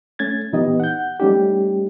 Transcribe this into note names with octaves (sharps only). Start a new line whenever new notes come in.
A3 C#4 G#6 A6
A#2 E3 B3 D#4 G4 D#5
F#5 G6
G3 A3 C#4 D#4 G4